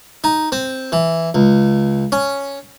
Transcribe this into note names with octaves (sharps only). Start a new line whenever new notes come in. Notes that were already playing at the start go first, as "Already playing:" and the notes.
D#4
C4
E3
C#2
C#4